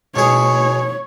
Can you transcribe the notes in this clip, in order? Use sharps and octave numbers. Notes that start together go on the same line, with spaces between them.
B2 G#4 C#5